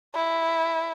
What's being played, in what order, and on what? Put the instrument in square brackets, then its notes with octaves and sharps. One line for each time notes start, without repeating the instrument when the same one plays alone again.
[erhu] E4